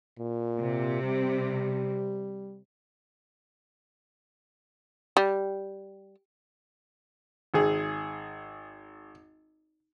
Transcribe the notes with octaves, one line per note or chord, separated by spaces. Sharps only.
A#2
C3
G3
G3
G#1 G#4